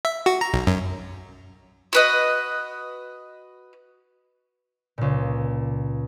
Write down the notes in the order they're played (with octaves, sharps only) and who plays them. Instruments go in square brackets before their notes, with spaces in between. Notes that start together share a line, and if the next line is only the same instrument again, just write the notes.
[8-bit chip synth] E5
F#4
A#5
B1
F#2
[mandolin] F#4 B4 D#5
[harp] C#2 A#2